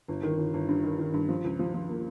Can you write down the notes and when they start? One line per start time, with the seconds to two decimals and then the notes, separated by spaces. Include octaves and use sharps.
0.08 G1
0.23 D#3
0.38 G1
0.54 G1
0.68 G2
0.84 D#3
0.99 D#3
1.14 G2
1.29 F3
1.44 C#2
1.59 F3
1.74 F3
1.89 A#3